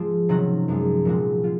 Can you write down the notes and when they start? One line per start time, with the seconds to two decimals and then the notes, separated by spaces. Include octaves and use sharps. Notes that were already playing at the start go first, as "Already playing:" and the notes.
Already playing: G#2 F3 G#3 C4
0.29 C3 D#3 F#3 C#4 F#4
0.68 F#2 F3 G#3
1.05 A#2 F3 G#3 C4 F#4
1.44 G#3 F4